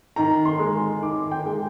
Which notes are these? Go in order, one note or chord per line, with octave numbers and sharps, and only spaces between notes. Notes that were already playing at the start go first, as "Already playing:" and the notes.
D#3 A#5
C6
G#3
D#3 D6
G5
G#3